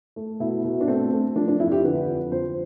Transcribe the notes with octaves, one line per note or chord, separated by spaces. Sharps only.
A3
B2 E4
B2
D4
A3 C4
A3
F3 D4
D4
F2 E4
F4
G4
D3 B4
F2
F3 C5